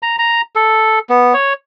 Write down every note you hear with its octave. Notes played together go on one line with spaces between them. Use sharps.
A#5
A#5
A4
B3
C#5